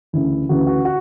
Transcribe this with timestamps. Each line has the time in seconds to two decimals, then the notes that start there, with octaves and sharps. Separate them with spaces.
0.13 D2 C#3 E3 E4
0.49 D2 C#3 E3 F#4
0.67 F#4
0.85 F#4